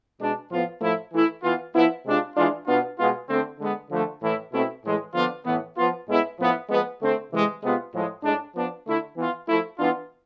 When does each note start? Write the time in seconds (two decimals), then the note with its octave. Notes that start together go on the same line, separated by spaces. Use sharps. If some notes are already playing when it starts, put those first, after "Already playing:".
0.20 B2 G#3 D4
0.50 A2 F3 B3 F4
0.81 A2 F3 A3 E4
1.12 E3 A3 E4
1.42 E3 B3 F4
1.74 F3 B3 E4
2.05 C3 G#3 D4 F4
2.36 E3 G#3 D4 F4
2.67 B2 B3 D4 F4
2.98 B2 G#3 B3 F4
3.29 D3 A3 C4
3.59 D3 G#3 B3
3.90 D3 F3 A3
4.22 A2 E3 A3 E4
4.52 B2 A3 C4 E4
4.83 A2 E3 G#3
5.14 D3 F3 B3 D4 F4
5.45 A2 E3 B3
5.77 F3 B3 F4
6.07 A2 G#3 B3 E4
6.38 A2 F3 B3 E4
6.69 F3 G#3 B3
7.00 D3 A3 C4
7.31 C3 E3 G#3
7.62 C3 G#3 B3 F4
7.93 A2 F3 G#3
8.23 A2 G#3 D4
8.54 F3 B3 D4
8.86 D3 A3 E4
9.16 E3 B3 F4
9.48 F3 A3 E4
9.78 E3 B3 D4 F4